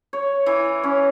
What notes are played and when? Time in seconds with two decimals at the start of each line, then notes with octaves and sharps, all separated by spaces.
0.13 C#5
0.46 E3
0.84 C#4